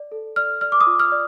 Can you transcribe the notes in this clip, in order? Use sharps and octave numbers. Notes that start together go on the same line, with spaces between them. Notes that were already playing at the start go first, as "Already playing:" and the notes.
Already playing: D5
A4
D5 F6
D5 F6
D6
D#6
F4
F6
D5